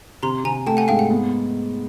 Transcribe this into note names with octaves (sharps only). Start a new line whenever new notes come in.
C3 A#5 C6
C3 G#5 A#5
A3 G5 A5
F#5 G#5
G#2 F5 G5
F#5
B3